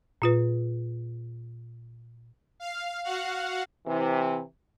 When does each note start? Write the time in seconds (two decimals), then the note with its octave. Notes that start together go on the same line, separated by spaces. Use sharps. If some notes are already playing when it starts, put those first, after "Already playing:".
0.22 A#2 F4 B4
2.60 F5
3.04 F#4 F5 F#5
3.87 C3 E3